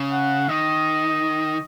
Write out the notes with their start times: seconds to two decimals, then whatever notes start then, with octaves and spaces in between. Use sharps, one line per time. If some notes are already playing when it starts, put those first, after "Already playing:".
Already playing: C#3
0.11 F#5
0.49 D#3 D#5